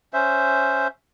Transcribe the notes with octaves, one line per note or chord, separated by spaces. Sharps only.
C#4 C5 E5